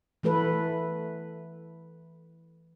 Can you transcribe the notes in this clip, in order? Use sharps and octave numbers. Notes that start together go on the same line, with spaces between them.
E3 A3 A4 B4